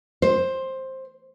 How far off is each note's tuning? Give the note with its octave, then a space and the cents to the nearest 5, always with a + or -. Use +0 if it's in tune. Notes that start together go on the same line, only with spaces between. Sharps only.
C5 +10